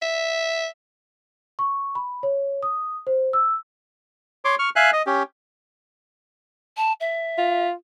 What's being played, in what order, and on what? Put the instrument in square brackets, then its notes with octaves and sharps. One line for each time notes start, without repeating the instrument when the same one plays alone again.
[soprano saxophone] E5
[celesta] C#6
B5
C#5
D#6
C5
E6
[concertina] C#5 C6 D6
C#6 F6
E5 F5 G#5 F#6
D#5
C#4 G4
[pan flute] A5
E5
[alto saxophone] F4